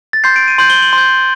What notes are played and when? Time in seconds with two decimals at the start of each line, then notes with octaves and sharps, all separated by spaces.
0.13 A6
0.24 C6 G6 C7
0.36 D7
0.48 D#7
0.58 C6 G6 F#7
0.70 G7
0.82 F#7
0.93 C6 G6